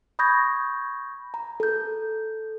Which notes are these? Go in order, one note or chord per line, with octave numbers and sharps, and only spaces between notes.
B5 C#6 D#6 G6 G#6 A#6
A#5
A4 G6